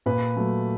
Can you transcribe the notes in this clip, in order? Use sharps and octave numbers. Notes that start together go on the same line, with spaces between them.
A#2 B4
F#3 A3